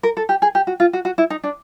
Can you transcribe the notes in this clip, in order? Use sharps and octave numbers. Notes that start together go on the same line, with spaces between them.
A#4
A4
G4
G#4
G4
F#4
F4
F#4
F#4
E4
D#4
D4